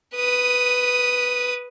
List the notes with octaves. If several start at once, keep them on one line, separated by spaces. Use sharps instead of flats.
B4 D#6